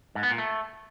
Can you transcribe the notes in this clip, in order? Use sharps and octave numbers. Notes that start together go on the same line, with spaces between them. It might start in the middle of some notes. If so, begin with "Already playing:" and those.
G#2
B3
A#2
A3